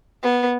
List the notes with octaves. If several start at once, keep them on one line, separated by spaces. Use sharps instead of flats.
B3